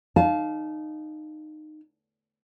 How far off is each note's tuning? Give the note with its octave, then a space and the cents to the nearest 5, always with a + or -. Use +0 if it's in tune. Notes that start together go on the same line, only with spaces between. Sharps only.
D#4 -15 F5 +0 A5 -40